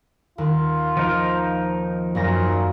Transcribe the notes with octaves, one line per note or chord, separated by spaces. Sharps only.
D#2 F4
F3 D#4 A#4
F#2 A#2 C#4 A#6